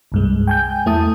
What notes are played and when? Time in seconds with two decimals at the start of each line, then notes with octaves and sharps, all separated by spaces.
0.12 C2 G2 G#3
0.47 G5 G#5 G6
0.86 E2 A3 E4 A5 D#6